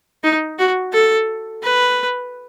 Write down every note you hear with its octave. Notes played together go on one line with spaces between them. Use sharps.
D#4
F#4
A4
B4